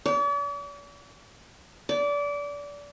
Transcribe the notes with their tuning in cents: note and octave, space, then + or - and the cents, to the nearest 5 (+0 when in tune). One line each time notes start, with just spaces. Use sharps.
D5 -45
D5 -25